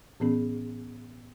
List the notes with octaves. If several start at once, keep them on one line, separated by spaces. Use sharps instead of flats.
A2 E3 B3 C#4 G#4